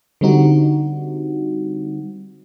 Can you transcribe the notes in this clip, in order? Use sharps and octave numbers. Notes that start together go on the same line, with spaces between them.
D3 G3 C4 D#4 F#4